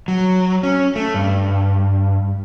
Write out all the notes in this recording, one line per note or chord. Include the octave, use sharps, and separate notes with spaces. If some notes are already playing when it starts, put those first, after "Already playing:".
F#3
C#4
A3
G2